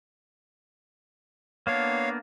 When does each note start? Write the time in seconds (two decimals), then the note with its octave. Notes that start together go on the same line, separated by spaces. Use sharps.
1.67 A#3 B3 D4 C#5 F5